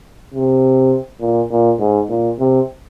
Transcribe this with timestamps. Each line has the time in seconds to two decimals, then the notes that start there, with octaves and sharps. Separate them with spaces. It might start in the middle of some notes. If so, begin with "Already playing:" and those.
0.34 C3
1.21 A#2
1.51 A#2
1.80 G#2
2.09 A#2
2.39 C3